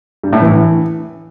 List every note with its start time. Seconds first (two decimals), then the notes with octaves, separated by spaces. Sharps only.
0.24 G2
0.33 A2
0.42 E3